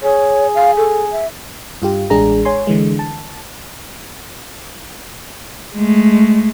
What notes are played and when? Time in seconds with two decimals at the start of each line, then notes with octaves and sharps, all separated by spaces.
0.02 G#4 C#5
0.55 F5
0.77 A4
1.12 E5
1.82 G2 F4 G4
2.10 A1 G#3 D4 G#4 A#5
2.45 C#5 G#5 C6
2.67 D3 E3 G#3
2.99 A5
5.75 G#3 A3